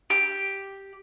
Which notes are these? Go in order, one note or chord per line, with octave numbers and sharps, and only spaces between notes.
G4